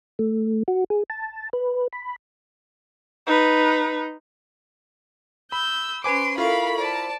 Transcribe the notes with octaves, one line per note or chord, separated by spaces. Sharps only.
A3
F#4
G#4
A5
B4
B5
D#4 B4
B5 E6 G6
C#4 B4 C5 G#5 C6 D6 D7
E4 F4 A4 A#4 F5 B5 C#6
C5 D5 A5